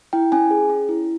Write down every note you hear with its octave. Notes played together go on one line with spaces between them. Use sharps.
E4 G5
C#4 G#5
G#4
C#4
E4